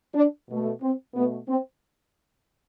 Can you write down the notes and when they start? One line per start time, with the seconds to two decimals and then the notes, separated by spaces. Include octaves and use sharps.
0.14 D4
0.48 B2 A3
0.82 C4
1.14 B2 A3 B3
1.48 C4